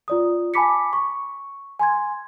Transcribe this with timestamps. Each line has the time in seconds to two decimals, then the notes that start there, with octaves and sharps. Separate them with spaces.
0.08 F4 D5 D#6
0.54 G#5 A5 B5 D6 B6 C#7
0.93 C#6
1.79 G#5 C6 G#6